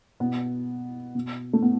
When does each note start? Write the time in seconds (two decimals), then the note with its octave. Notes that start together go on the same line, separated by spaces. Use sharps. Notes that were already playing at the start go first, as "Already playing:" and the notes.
0.20 B2 B3
1.15 B2
1.53 A3
1.62 B3